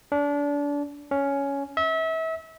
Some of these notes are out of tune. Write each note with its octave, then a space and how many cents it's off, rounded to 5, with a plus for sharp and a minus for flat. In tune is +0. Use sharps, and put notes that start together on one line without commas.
D4 -30
C#4 +10
E5 -30